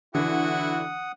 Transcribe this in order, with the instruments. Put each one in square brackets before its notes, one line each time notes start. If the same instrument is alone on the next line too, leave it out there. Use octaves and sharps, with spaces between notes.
[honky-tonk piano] D3 [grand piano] E3 [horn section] E4 F#4 [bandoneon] F#5 D#6